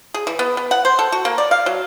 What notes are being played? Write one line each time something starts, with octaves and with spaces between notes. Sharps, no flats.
G#4
E3
B3
B3
F#5
C5
A4
F#4
A#3
D5
F5
F#3